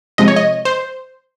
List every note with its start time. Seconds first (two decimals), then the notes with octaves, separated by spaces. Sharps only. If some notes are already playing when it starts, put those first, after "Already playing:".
0.18 C3 F3 G#3 D#5
0.28 C#5
0.36 D#5
0.65 C5